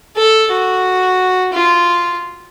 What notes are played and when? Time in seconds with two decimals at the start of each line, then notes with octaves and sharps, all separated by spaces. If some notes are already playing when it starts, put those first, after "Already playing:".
0.17 A4
0.51 F#4
1.53 F4